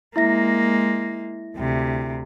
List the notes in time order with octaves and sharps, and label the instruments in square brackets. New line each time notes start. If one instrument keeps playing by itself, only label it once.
[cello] G#3 A#3 [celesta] E4 E5 A#6
[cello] D2 C3